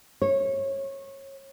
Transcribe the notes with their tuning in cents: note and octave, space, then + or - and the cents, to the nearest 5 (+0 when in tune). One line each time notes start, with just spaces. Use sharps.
C#5 -25